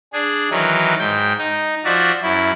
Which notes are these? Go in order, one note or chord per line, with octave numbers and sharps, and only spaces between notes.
D4 G#4
D#3 E3 F#3
G#2 G5 G6
D#4
F3 F#4 D5 E5
F#2 E4